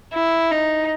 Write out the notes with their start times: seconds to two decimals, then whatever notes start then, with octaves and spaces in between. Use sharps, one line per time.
0.14 E4
0.52 D#4